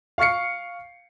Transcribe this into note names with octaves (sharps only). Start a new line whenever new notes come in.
F5 C#6 F6 C7 C#7